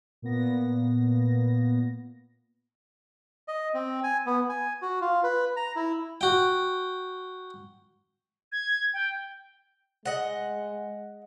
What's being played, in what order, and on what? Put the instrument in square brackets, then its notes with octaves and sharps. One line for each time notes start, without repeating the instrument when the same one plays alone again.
[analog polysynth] A#2 A#3 B3 A#6
[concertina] D#5
C4
G#5
B3
G#5
F#4
F4
B4
A#5
E4
[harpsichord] F#4 G5
[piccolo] G#6
G5
[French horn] G#3 [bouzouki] D#5 F#5